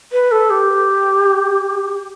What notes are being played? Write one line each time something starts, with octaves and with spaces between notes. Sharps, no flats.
B4
A4
G4